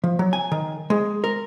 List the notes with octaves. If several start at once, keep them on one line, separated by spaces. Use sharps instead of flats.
F3
F#3
G#5
D#3
G#3
A#4